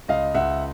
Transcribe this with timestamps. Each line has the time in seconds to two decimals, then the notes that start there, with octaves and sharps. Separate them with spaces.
0.08 C#2 D#5 F5
0.34 C#2 E5 F#5